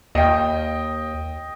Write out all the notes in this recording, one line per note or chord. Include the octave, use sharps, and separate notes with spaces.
D#2 D#5 G5